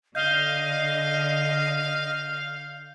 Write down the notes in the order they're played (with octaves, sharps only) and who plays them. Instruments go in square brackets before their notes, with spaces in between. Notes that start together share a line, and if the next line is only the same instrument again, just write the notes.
[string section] D3 [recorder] D#5 [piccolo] F5 [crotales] G6 G7